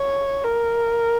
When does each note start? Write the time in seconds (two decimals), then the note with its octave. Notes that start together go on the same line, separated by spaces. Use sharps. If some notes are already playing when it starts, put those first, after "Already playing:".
Already playing: C#5
0.44 A#4